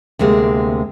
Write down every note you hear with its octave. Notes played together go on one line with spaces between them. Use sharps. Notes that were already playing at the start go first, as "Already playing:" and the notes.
D2 C3 G#3 A#3